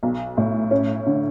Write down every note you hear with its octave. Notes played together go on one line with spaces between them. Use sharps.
B1
A2
C#4
D3